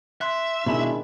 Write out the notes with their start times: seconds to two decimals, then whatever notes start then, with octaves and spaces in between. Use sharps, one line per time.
0.21 E5 C6 F#6
0.66 B2 D#3 G#3 D4 E4